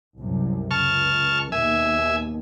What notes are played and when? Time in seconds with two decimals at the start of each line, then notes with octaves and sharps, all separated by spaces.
0.19 C2 F#2 C3
0.71 C#2 A5 C#6 F6
1.52 D#2 B2 E5 G#5